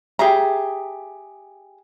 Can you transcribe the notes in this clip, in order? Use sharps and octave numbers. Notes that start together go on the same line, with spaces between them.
G4 G#4 E5 A#5